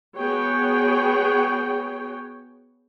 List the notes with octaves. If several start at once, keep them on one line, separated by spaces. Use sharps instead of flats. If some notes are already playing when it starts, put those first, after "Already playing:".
B3 F#4 G#4 C#5 G5